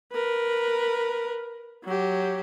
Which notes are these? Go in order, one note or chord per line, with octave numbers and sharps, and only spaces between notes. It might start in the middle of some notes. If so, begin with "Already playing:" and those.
A#4 B4
F#3 G4